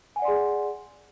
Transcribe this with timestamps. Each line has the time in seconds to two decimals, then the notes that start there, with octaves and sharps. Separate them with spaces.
0.16 G#5
0.19 F#5
0.22 D5
0.25 C6
0.28 G#4